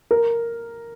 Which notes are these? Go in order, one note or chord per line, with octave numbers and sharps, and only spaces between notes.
A#4